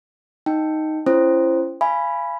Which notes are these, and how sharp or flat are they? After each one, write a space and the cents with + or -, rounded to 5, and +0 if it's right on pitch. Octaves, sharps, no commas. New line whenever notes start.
D#4 +0 G5 +0
C#4 +0 E4 +45 C5 +0
F5 -35 G#5 +0 B5 +0